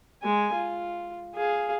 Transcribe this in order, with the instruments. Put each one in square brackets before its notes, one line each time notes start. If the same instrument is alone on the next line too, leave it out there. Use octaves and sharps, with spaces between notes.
[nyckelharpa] G#3 G#5
F4
G#4 F5